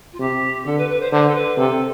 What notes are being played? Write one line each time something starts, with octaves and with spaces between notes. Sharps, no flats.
F4
C3 G4
D3 A4
B4
B4
C5
D3 C5
A4
B4
C3 A4